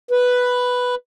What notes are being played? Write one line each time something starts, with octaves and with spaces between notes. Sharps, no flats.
B4